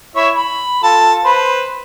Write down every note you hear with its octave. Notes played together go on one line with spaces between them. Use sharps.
E4 C#5 E5
B5
F4 A4 A5
B4 C5